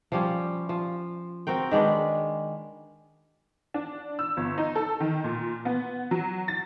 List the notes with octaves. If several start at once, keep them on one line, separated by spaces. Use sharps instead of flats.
F3 G3 C#4
F3
C4 F#4 A#4 G5
D#3 G#3 D4 B4
D4
E6
G1
D#4
A4
D#3
A#2
B3
F#3
A6